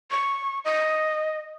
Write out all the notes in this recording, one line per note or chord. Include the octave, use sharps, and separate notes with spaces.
C#6
D#5